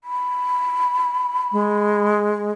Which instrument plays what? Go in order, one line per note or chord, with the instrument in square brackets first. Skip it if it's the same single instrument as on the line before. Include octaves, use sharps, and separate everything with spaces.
[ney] B5
[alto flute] G#3